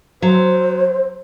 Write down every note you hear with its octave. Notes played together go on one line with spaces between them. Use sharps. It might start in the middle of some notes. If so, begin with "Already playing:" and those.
F#3 C5